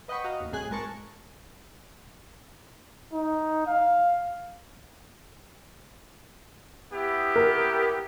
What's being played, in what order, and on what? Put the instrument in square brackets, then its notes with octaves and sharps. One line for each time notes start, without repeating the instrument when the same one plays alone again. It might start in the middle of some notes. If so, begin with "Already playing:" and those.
[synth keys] B4 D#5 F#5 G5 B5 C#6
F#4 D#5 F5 F#5 A#5
A1 D#2
C2 A2 G#4 G#5 F#6
G#1 G#3 A#4 A5 C#6
[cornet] D#4
F5
[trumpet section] B3 E4 G4
[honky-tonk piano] A#4